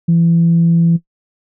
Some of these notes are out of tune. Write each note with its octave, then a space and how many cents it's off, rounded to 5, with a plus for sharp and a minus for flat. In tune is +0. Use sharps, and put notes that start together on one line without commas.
E3 +30